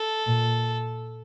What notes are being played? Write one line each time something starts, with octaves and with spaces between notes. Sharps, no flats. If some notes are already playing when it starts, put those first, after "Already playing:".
Already playing: A4
A#2